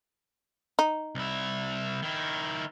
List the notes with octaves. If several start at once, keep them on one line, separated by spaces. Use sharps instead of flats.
D#4
C2 E4
D#3 E4